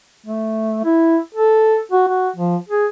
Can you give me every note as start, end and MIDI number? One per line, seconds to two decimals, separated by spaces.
0.26 0.80 57
0.85 1.18 64
1.34 1.78 69
1.91 2.04 66
2.08 2.29 66
2.36 2.57 53
2.69 2.87 68